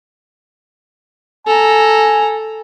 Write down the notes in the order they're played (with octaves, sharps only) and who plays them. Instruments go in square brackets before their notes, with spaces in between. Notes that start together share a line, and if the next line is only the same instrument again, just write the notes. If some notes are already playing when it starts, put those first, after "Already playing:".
[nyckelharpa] A4 A#5 [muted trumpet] G#5